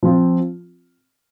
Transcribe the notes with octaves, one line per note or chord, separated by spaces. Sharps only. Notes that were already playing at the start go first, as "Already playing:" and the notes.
F3 C4 F4